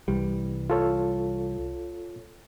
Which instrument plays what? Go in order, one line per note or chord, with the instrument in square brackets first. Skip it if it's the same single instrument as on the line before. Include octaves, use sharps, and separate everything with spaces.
[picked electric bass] C2 E3 G3
[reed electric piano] F4 A4 C#5